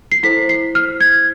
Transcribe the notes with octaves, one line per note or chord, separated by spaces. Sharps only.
C7
E4 A4 C5 B6
C7
F6
G#6